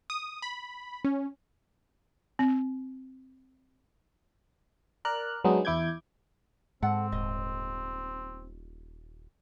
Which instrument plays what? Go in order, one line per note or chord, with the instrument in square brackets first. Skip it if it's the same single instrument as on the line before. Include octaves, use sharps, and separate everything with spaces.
[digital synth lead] D#6
B5
C#4
[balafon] C4
[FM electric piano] A#4 D5 F6 F#6
F#3 G#3 B3 D4 D#4
E2 E4 D6 G6 G#6
[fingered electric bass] G#2 [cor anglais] C4 [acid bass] A4 [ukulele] F#5
[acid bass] D#1 [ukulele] D#5